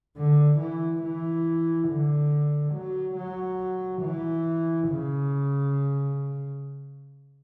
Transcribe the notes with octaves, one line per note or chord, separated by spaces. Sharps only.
D3
E3
E3
D3
F#3
F#3
E3
C#3